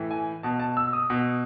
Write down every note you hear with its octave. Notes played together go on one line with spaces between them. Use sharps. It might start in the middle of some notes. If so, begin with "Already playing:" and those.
Already playing: A2 E3
G#5
B2 A5
A5
E6
D#6
B2